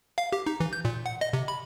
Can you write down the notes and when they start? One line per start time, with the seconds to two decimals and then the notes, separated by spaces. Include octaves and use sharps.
0.18 F5
0.32 G4
0.46 D#4
0.60 E3
0.73 G6
0.85 A#2
1.06 F#5
1.21 D#5
1.33 C3
1.48 B5